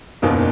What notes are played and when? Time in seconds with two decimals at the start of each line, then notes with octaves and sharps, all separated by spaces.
0.22 F#1 E2 B2 A#3 D#4